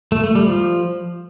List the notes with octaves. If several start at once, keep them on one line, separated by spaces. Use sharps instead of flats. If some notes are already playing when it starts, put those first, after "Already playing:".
A3
A3
G3
F3